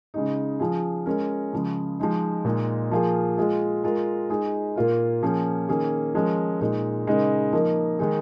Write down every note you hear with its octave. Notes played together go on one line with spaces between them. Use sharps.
C#3 G#3 D#4
F3 C#4 F4 G#4
G#3 C#4 A#4
C#3 F3 G#3
F3 G#3 D#4
A#2 G#3 D#4 G#4
F3 A#3 F4 G#4
G#3 F4 G#4
G#3 F4 A#4
G#3 D#4 G#4
A#2 A#3 F4 A#4
F3 A#3 C#4 G#4
D#3 A#3 C#4 G#4
F3 G#3 C#4 A#4
A#2 G#3 D#4
C#3 G#3 D#4 A#4
F3 A#3 D#4 A#4
D#3 G#3 D#4 G#4